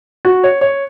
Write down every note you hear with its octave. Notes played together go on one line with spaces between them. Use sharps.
F#4
C#5
C#5